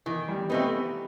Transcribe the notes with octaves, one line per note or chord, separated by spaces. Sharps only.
D#3 E3
G3
A3 B3 C4 D#4